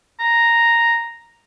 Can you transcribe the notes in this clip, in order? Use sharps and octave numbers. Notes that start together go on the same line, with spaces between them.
A#5